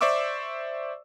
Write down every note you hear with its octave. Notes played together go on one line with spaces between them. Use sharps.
C5 D5 E5 C#6 D6 E6